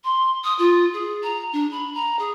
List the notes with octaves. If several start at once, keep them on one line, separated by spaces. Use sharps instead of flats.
C6
D#6
F4
G#4
A#5
D4
B5
A#5
G#4